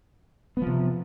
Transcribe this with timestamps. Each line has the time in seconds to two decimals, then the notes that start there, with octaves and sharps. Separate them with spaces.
0.57 B3
0.62 F3
0.67 C3